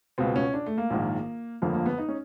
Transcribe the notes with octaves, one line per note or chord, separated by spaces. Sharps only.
C#2 B2 C4
C#4
D4
A3
A#3
A#1 G#2 D#3
G1 F2 D3 F3 A#3
A#3
B3
D#4
C#4